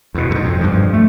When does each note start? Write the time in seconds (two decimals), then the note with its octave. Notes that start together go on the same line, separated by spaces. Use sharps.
0.15 E2 B2
0.30 E2 G#2
0.44 F2
0.61 G2 F3
0.93 A3